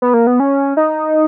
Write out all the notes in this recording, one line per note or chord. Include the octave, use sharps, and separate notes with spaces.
B3
A#3
B3
C#4
D#4